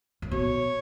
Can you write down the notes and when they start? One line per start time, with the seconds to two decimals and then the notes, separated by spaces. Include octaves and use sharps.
0.22 A2
0.31 B2 C#5